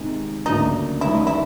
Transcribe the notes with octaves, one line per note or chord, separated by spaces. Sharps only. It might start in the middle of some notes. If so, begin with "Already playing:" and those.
Already playing: C3 D#3 G#3
D2 C#3 F#3 A#3 D4 D#4
F#2 D#3 G3 E4
D#4
E4